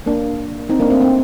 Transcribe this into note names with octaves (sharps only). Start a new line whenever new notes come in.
A#3 D4
C4 D#4
A#3 D4
A3 C4
A3 C4